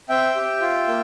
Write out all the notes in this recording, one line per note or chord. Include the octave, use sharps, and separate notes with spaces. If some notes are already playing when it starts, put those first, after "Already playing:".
C4 E5 G5
G4
F4
A#3